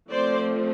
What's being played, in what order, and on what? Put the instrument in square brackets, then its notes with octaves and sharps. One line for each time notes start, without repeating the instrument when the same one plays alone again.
[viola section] F3 A3 C4 C5 D5